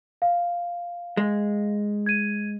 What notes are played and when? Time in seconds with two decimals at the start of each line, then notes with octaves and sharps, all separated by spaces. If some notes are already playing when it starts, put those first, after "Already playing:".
0.22 F5
1.17 G#3
2.06 G#6 D#7